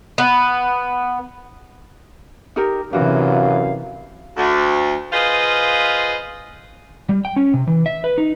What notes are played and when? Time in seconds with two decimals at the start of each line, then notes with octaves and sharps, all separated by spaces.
0.18 B3
2.56 D#4 G4 A#4
2.93 F#2 C3 E3 D4 F#4 F5
4.37 D2
5.12 F4 G#4 B4 C5 D#5 F5
7.09 G3
7.25 G5
7.36 C#4
7.54 C3
7.67 E3
7.86 E5
8.04 B4
8.18 D#4